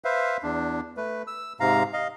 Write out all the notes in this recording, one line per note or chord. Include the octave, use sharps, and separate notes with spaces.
B4 C5 E5 F5
E2 D4
A3 B4
E6
G#2 C3 F5 A#5
D#5 F5